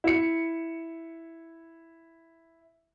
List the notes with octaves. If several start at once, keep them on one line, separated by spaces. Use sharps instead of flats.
E4 C#7